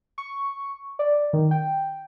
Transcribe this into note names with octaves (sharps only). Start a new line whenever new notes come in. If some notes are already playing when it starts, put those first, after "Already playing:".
C#6
D5
D#3
G5